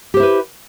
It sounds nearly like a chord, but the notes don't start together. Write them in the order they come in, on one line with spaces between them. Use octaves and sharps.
G4 C5 E4 B4